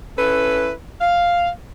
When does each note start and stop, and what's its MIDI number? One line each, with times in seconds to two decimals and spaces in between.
0.18 0.72 61
0.18 0.72 64
0.18 0.72 69
0.18 0.72 71
1.01 1.49 77